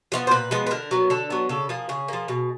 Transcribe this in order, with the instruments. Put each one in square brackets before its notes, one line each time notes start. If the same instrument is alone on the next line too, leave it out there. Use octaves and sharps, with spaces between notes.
[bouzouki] F3 G#3 B3
C5
A#2 B4
F3 G#3 B3
B4
D3 A#4
F#3 B3
D3 A4
F#3 B3
C#3 A4
F3 A#3 G#4
C#3 G#4
F3 A#3
B2